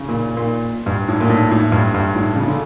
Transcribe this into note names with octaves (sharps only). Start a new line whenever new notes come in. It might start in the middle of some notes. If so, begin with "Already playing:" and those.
Already playing: C#3
A#2
A#2
G2
A2
A#2
A2
A2
G2
G2
A2
C#3
D3